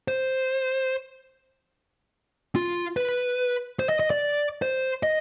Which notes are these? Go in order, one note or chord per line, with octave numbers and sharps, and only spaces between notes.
C5
F4
B4
C5
D#5
D#5
D5
C5
D#5